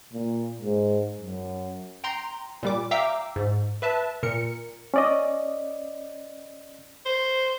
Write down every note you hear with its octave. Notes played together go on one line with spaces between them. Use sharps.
A#2
G#2
F#2
G5 A#5 C6
A#2 G3 D6
E5 F5 G5 A#5 D6 E6
G#2
B4 E5 A5
A#2 A#4 C#7
C#4 D5 D#5
C5